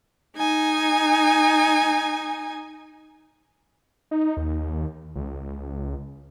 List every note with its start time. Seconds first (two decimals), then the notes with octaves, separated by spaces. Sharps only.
0.37 D#4 G#5
4.11 D#4
4.37 D#2
5.16 C#2